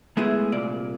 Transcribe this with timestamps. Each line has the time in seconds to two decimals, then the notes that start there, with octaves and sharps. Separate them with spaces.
0.17 G#3 A3 B3 E4 G#4
0.52 C2 A#2 D5